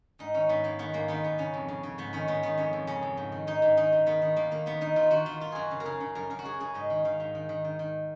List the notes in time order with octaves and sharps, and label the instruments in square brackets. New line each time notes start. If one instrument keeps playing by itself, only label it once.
[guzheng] G#2 D#4
D#3 C#4
G#2 B3
G#2 A#3
D#3 B3
G#2 A#3
D#3 B3
G#2 B3
C#3 C#4
F2
C#3
C#3
G#2 B3
D#3 C#4
G#2 B3
D#3 B3
F2 C#4
F2
C#3 C#4
F2
G#2
D#3
G#2 D#4
G#2
D#3 D#4
G#2
D#3 B3
D#3
D#3 A#3
D#3 A#3
D#3 B3
D#3 D#4
D#3 F4
D#3 F#4
D#3 F4
D#3 F4
F#2 F#4 G#4
C#3
A#4
C#3 G#4
C#3
F#2 A#4
F#2 A#4
F#4
F#2 G#4
C#3 G#4
G#2 D#5
D#3
D#3 F5
G#2
D#3
D#3
D#3
D#3